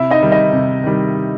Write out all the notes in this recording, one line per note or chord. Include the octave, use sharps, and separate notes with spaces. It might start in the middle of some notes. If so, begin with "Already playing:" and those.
Already playing: C3 E4 E5
D#4 D#5
D#3 G3
D#4 D#5
C3
D#3 G3